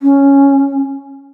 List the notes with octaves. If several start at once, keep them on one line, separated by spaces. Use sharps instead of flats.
C#4